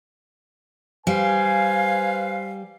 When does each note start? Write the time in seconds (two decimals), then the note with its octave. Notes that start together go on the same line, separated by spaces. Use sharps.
1.07 G3 B4 C5 F5 G#5